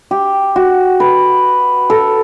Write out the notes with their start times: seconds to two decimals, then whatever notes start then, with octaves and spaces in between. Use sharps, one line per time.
0.11 G4
0.56 F#4
1.00 B4
1.90 A4